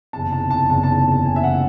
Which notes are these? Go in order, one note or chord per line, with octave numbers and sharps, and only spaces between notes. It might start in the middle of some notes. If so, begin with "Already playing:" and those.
F#1 E2 C3 A5
A5
A5
F#1 E2 C3 A5
A5
A5
F#1 E2 C3 G#5
E5
F#5